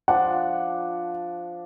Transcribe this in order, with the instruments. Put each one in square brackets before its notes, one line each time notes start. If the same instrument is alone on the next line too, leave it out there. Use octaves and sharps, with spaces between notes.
[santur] F3 D4 [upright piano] F#5